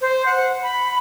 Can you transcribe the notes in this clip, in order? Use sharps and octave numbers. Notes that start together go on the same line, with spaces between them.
C5
F#5
B5